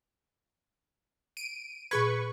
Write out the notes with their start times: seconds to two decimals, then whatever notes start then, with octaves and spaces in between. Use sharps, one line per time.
1.37 D7 D#7
1.91 A#2 G#4 B4 C#6 G#6